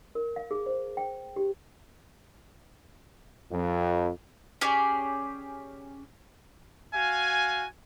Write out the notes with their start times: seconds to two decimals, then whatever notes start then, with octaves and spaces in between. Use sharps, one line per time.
0.15 A#4
0.36 F5
0.51 G#4
0.66 C5
0.97 G5
1.36 G4
3.52 F2
4.61 C#4 G4 G#4 D5
6.94 F#4 F5 G#5